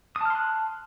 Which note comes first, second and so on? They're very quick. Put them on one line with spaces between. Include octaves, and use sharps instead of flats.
D#6 A5 F6 C6 F#6